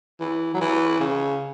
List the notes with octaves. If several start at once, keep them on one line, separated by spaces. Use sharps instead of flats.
E3
F#3
E3
C#3